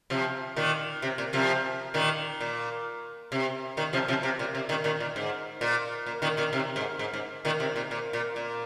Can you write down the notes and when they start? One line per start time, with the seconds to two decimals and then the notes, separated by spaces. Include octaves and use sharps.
0.10 C3 F3
0.56 A#2 D#3
1.02 C3
1.18 A#2
1.33 C3 F3
1.94 A#2 D#3
2.41 A#2
3.32 C3
3.77 A#2 D#3
3.93 C3 F3
4.08 C3 F3
4.23 C3
4.39 A#2
4.55 C3
4.69 A#2 D#3
4.84 A#2 D#3
5.00 A#2
5.16 G#2
5.61 A#2
6.06 A#2
6.22 A#2 D#3
6.37 A#2 D#3
6.53 C3
6.76 G#2
6.99 G#2
7.14 G#2
7.45 A#2 D#3
7.60 C3
7.76 A#2
7.91 A#2
8.13 A#2
8.36 A#2